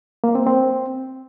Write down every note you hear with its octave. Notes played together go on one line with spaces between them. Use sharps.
A#3
C4
C4